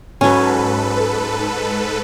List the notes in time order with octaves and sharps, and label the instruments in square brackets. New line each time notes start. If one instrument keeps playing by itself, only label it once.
[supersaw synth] G#2 A4 B4 [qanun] F#3 C#4